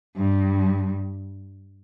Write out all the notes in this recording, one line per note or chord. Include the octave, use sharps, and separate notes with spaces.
G2